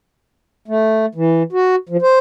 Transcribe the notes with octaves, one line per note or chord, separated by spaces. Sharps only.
A3
E3
F#4
F3
C5